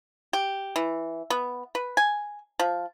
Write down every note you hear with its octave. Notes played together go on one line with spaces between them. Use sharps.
G4
E3
B3
B4
G#5
F3